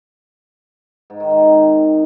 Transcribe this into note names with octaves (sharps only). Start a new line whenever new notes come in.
G#2
D#3
D#3
C3